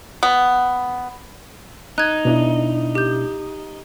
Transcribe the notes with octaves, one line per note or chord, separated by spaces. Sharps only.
B3
D#4 F#6 G#6
B2 D4 E4
G4 G6